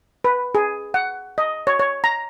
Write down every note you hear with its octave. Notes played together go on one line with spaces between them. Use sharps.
B4
G#4
F#5
D#5
C#5
C#5
A#5